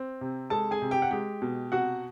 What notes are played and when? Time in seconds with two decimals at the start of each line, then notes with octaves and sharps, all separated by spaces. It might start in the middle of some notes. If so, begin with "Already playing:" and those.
Already playing: C4
0.21 C3
0.50 G#3 A4 A5
0.71 G#4 G#5
0.82 C3
0.91 G4 G5
1.02 F#5
1.11 G#3 G4 G5
1.42 B2
1.72 C3 F#4 F#5